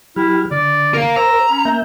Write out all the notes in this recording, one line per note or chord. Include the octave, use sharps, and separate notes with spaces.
F#3 E4 G4 F6
D3 D5
A#4 F5
A#4 C5 A#5 E6
C#4 B5
A#3 E5 G6